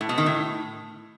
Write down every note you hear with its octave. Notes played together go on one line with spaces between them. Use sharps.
A2
B2
D#3
A2